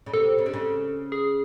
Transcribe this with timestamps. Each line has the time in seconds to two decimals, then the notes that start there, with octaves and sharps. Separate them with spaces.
0.06 C#3
0.13 C3 A4
0.38 C#3
0.46 D3
0.53 C#3
1.12 G#4